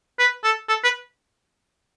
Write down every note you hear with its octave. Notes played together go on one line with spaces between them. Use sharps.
B4
A4
A4
B4